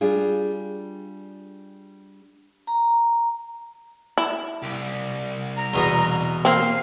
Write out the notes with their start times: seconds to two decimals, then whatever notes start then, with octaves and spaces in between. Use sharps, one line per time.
0.01 G3 D4 F4 G#4
2.67 A#5
4.18 E4
4.62 C2 G4
5.57 A#5
5.74 E2 B2 B3
6.45 A#3 C4 F5